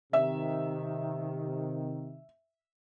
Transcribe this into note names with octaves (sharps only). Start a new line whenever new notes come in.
C3 D#3 E5